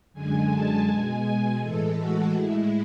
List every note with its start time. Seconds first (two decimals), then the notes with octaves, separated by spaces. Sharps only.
0.13 F#2 D3 G#3 G#5
0.51 A5
0.87 B2 G#3 G#5
1.60 A2 E3 G#3 A4
1.97 F#4
2.33 A2 G#3 E4